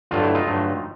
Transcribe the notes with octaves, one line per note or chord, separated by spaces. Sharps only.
G2 D3 F#3 A3 F4
E4
D#4 F4
G2 D3 F#3 A3